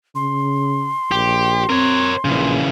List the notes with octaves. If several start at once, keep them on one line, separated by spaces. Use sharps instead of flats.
C#3 C6
A#1 G4
C4 A#4 C#5
A#1 C#3 E3